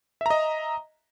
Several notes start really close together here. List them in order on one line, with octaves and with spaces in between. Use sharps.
E5 A#5 D#5